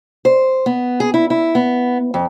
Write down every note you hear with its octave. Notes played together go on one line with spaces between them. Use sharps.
C5
B3
G#4
E4
E4
B3
F2